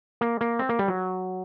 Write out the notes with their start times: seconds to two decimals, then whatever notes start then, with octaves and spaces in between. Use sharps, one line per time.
0.21 A#3
0.41 A#3
0.59 C4
0.69 A#3
0.79 G3
0.88 F#3